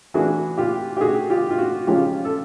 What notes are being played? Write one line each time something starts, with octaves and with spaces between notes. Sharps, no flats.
E3 A3 D4 F4 F#4 G#4
F4 G4
G4
F#4 G#4
F4 G4
F4
F#4
C#3 F3 G#3 C#4 F4 G4
A4